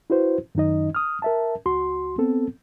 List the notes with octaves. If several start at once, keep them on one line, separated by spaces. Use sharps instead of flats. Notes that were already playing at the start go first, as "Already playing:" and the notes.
E4 F#4 B4 C5
F#2 D#3 D#4 D#5
D#6 F6
A#4 E5 A5
C#2 F#4 C6
B3 C4 A4